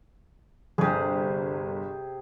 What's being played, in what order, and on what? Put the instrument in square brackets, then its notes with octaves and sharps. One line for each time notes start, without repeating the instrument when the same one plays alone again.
[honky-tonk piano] G1 [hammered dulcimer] C3 G#4